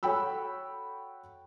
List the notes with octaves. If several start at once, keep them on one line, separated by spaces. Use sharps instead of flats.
F#4 A4 C#5 G5 B5 E6